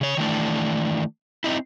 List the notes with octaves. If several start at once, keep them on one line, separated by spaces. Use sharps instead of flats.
C#3 C#5
D#3 E3 A3 D4
C4 D#4 E4